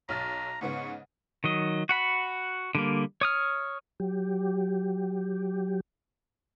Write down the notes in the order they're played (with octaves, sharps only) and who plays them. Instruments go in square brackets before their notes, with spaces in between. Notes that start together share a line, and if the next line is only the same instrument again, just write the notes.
[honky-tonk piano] B1 F6 A6 [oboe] A#5
[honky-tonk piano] G#2 C#3 B3 [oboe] C#6
[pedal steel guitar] D#3 F#3 D#5
F#4 F#5 B5
D3 G3 A#3
C#5 D#6 F6
[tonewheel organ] F#3 G4